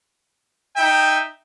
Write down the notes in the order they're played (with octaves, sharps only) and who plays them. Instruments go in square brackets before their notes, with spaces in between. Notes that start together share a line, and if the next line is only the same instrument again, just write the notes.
[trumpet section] D#4 E5 G5